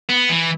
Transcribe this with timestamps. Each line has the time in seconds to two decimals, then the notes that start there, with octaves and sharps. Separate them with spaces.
0.09 B3
0.29 E3